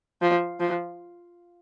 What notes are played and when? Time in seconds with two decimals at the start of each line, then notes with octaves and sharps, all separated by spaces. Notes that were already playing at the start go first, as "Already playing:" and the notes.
0.22 F3
0.60 F3